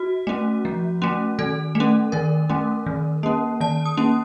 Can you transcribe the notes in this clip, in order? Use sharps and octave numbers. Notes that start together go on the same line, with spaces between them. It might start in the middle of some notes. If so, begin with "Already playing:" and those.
Already playing: F#4
A3 C#4
F3
A3 C#4
D#3 A4
A3
C#4
D#3 A#4
A3 C#4
D#3
A#3 C#4
D#3 A5
D#6
A#3 C#4